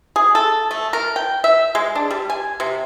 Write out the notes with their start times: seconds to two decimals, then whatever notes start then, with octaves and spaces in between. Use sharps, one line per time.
0.16 G#4
0.35 A4
0.71 A3
0.93 A#4
1.16 G5
1.44 E5
1.75 G#3
1.95 D4
2.11 G3
2.30 G#5
2.60 C3